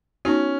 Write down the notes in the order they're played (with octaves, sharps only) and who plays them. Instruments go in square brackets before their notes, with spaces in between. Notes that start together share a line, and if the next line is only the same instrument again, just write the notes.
[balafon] B3 D#4 F#4 [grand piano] C#4